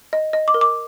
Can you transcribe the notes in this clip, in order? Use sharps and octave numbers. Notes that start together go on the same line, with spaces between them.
D#5
D#5
D6
A#4
D6